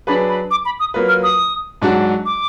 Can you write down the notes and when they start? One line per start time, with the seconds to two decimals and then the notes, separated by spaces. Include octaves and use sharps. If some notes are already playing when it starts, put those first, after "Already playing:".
0.07 F#3 D4 G#4 B4 B5
0.29 B5
0.51 D6
0.65 B5
0.80 D#6
0.94 F#3 A#3 F4 B4
1.09 F6
1.23 D#6
1.82 G#2 F#3 D4 F#4
2.25 D6